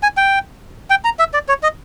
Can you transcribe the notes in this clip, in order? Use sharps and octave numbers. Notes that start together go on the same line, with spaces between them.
G#5
G5
G5
A#5
E5
D5
C#5
D#5